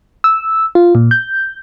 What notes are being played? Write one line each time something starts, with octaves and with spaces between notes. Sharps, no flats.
E6
F4
A#2
G6